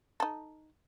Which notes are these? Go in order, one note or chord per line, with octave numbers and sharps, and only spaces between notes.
D#4 A4